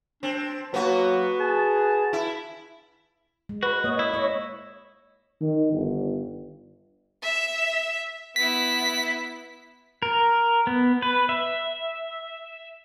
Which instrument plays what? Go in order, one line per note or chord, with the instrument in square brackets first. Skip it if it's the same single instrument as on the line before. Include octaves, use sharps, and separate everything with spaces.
[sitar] C4 [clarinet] D4
[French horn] F#3 [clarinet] A#3 [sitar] B3 F#4
[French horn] G#4 [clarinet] A5
[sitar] E4
[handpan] G#3
[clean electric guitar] F#4 [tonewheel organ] B4
[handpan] A#3 C#5 [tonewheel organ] D#5
[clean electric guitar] E4
[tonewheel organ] C#5 [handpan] D#5
[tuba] D#3
G1
[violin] E5 E7
[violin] B3 E4 [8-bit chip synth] B6
[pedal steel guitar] A#4
B3
B4
E5